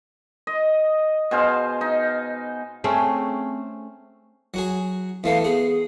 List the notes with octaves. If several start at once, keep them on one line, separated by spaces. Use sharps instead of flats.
D#5
B2 G#4 C5 F5
D#4
A3 C4 C#4 G#4
F#3 F#4 G#4
E2 A3 B3 F5
B3 G#4